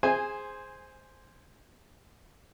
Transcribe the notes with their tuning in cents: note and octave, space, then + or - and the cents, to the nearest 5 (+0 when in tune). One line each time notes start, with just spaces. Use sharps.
G#4 +0 C5 +0 G#5 -15